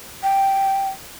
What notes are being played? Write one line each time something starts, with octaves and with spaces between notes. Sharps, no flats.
G5